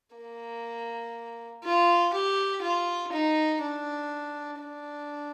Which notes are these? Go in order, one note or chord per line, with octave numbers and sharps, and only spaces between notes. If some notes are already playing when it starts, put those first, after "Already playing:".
A#3
F4
G4
F4
D#4
D4
D4